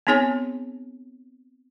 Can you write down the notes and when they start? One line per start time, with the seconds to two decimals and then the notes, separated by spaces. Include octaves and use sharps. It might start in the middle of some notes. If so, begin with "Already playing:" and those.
0.07 B3 C4 D#4 G#4 C#5 G#5